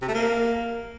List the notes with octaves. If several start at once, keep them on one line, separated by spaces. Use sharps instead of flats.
C3
A3
A#3